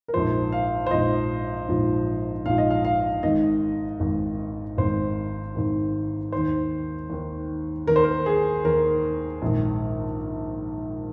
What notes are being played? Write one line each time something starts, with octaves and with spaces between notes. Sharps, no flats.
A#4
A#1 G#2 F3 C5
F5
C5
A#1 G#2 F3 D#5
A#1 G#2 F3
A#1 G#2 F3 F5
D#5
F5
F5
G#1 G#2 D#3 D#5
G#1 G#2 D#3
G#1 G#2 D#3 C5
G#1 G#2 D#3
D#2 D#3 C5
D#2 D#3
D#2 D#3 A#4
C5
A#4
G#4
D#2 D#3 A#4
A#1 G#2 D#3